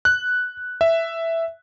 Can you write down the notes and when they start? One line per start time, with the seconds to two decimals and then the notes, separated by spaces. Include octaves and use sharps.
0.05 F#6
0.81 E5